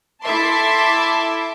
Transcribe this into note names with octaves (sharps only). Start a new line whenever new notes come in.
E4 A4 E5 A5 C6 D6